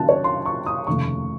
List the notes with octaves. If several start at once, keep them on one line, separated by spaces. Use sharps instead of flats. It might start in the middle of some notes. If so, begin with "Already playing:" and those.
Already playing: F#1 F#2 D#3 F#3 A5 F#6
C#5
C6
C#6
D#6
F1 D#2 C#3 A3 C#6